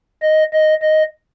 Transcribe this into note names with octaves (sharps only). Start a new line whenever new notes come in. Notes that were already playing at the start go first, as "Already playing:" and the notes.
D#5
D#5
D#5